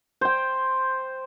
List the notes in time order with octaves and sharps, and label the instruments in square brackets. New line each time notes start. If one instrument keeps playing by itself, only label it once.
[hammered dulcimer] C5 G5